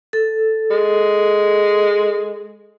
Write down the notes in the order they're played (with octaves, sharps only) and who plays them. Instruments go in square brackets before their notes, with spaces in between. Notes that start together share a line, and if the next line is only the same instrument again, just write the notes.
[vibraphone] A4
[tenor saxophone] G#3